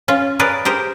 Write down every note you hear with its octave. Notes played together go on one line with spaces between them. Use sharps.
C#4 F4
G#4 A#4 B4 C#5 D5
G4 G#4 A#4 C5